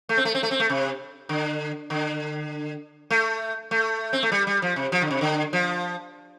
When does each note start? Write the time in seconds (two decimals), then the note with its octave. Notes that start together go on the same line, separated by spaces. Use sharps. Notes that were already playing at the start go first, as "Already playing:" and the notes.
0.09 A3
0.17 C4
0.25 A3
0.35 C4
0.43 A3
0.51 C4
0.60 A3
0.70 C3
1.29 D3
1.90 D3
3.10 A3
3.71 A3
4.13 C4
4.23 A3
4.32 G3
4.47 G3
4.62 F3
4.76 C3
4.92 F3
5.02 D3
5.11 C3
5.21 D3
5.53 F3